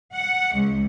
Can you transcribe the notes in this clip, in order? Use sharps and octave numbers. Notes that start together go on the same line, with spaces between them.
F#5
C#2